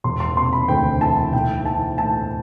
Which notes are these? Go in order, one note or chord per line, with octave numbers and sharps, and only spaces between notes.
E1 C6
C6
C3 C6
B5
D2 G5
E3 A5
B1 G5
E3 A5
A2 A5